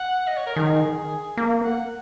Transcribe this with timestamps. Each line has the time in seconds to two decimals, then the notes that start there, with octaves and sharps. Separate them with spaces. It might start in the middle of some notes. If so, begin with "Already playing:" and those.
Already playing: F#5
0.27 D#5
0.37 C#5
0.46 A#4
0.56 D#3 G#4
1.37 A#3
1.64 F#5